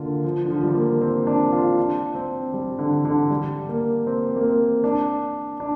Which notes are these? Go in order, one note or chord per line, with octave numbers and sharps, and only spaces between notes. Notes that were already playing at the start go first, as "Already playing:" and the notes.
Already playing: D3 A#3 F4
F3
D3
F3
G3
A#3
C4
D4
F4
D4
C4
G3
D3
D3
G3
A#3
C4
A#3
C4
D4
D4